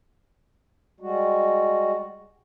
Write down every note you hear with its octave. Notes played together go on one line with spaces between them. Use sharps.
G3 G#3 F#4